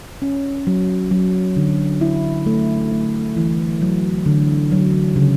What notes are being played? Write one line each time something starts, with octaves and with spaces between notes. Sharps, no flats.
C#4
F#3
F#3
D3
E4
A3
A3
E3
F#3
D3
F#3
C#3